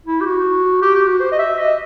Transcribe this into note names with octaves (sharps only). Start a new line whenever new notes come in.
E4
G4
F#4
G4
G4
F#4
C5
D#5
E5
D#5